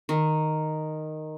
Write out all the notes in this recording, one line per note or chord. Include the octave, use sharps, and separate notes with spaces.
D#3